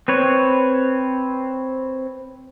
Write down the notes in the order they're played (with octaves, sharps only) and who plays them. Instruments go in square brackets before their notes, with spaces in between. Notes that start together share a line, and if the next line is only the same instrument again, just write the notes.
[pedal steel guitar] C4 B4 C#5